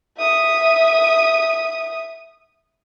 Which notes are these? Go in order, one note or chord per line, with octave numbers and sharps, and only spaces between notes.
E5 D#6